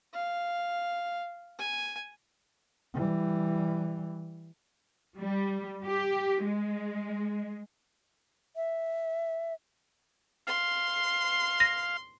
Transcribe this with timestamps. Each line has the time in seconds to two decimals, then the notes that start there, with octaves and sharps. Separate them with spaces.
0.14 F5
1.59 G#5
2.94 E3 G3
5.16 G3
5.85 G4
6.44 G#3
8.56 E5
10.47 F5 C6
11.60 A#6